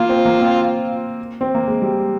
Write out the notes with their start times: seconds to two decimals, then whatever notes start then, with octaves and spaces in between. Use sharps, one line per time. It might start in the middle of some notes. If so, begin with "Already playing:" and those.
Already playing: A#3 F4
0.09 C4
0.25 A#3
0.41 C4
1.41 C4
1.55 A#3
1.68 G#3
1.82 G3